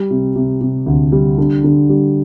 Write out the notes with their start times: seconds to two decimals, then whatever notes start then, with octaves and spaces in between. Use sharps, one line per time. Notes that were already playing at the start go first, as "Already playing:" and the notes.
Already playing: G3
0.11 C3
0.36 C3
0.61 C3
0.86 D2
1.12 G3
1.38 D3
1.64 D3
1.89 G3